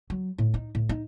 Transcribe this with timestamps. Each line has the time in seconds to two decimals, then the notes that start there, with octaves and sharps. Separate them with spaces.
0.10 F#3
0.38 A2
0.54 D#4
0.75 A2
0.89 D#4